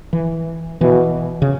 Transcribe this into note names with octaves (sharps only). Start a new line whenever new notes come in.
E3
B2 E3
C#3